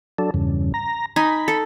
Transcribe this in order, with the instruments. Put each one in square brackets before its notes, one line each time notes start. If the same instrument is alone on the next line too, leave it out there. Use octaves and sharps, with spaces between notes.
[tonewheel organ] F#3 D4 A4
E2 G2 C#3
A#5
[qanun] D#4 G#5 [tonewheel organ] B5
[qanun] A4